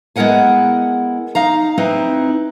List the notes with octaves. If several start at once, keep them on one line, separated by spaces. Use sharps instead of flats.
G#3 B3 E4 A#4 F#5 G#5
D#4 F5 A#5
C4 D#4 E4 B4